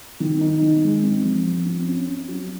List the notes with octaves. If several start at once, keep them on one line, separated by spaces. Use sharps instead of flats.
D#3
D#4
D#3
G#3
C4
F3
F3
C4
C#4
C#4
F#3